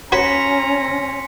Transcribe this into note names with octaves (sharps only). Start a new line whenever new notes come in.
C#4 F#4 B4 C#5 A#5 C6 B6 C#7